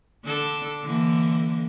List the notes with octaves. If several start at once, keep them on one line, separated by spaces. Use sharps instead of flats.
D3 D4 A4
D3 E3 A#3